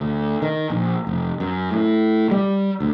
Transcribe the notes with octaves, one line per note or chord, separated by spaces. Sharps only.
D2
D#3
A#1
F1
F#2
A2
G3
D2